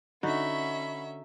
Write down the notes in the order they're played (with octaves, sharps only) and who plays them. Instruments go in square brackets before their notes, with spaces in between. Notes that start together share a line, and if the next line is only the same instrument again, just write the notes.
[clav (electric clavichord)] D3 [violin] C#4 E5 [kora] D#4 F#4 [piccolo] B5